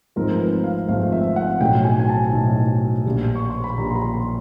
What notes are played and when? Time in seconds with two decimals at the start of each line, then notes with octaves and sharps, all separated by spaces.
0.16 G#1 G#2 F3 A3 C4 A#4
0.40 B4
0.64 F5
0.89 G#1 G#2 F3 A3 C4 F5
1.12 E5
1.36 F#5
1.61 B1 A2 F#3 G5
1.84 G#5
1.99 G#5
2.09 A5
2.33 B1 A2 F#3
3.06 A#1 A#2 G3 A#3
3.35 C#6
3.50 C6
3.64 B5
3.78 A#1 A#2 G3 A#3 A#5
3.91 C6
3.96 B5
4.14 C6